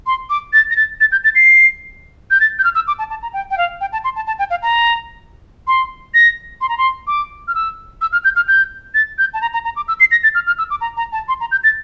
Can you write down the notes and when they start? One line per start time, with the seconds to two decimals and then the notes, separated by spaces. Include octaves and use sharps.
0.06 C6
0.30 D6
0.53 A6
0.70 A#6
0.76 A6
1.00 A6
1.12 G6
1.24 A6
1.35 C7
2.31 G6
2.40 A6
2.59 G6
2.64 F6
2.75 E6
2.87 D6
2.99 A5
3.10 A5
3.22 A#5
3.33 G5
3.51 G5
3.58 F5
3.81 G5
3.92 A5
4.04 C6
4.16 A5
4.27 A5
4.39 G5
4.50 F5
4.62 A#5
5.67 C6
6.14 A#6
6.61 C6
6.69 A#5
6.78 C6
7.07 D6
7.48 F6
7.55 E6
8.01 E6
8.12 F6
8.24 G6
8.36 F6
8.48 G6
8.94 A6
9.18 G6
9.34 A5
9.41 A#5
9.53 A#5
9.65 A#5
9.76 D6
9.88 E6
10.00 C7
10.11 A#6
10.23 A6
10.34 F6
10.47 F6
10.58 E6
10.70 D6
10.81 A#5
10.97 A#5
11.12 A5
11.28 C6
11.40 A#5
11.51 G6
11.64 A6